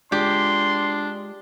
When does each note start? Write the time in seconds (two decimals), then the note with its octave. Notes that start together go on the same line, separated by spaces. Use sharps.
0.12 G#3 D4 F4 G4 G#4 C6